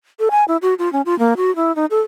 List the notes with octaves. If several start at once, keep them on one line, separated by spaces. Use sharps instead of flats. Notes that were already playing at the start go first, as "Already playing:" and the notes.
A4
G#5
E4
F#4
F4
C#4
F4
A#3
F#4
E4
D#4
A4